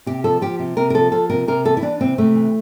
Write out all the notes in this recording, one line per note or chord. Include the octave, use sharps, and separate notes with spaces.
C3 G4
F3 A4
F3 G4
C3
C3 A#4
A#4
F3 A4
F3 A4
C3 A#4
C3 A#4
E3 A4
E4
E3 D4
C3 C4
C3 A3
E3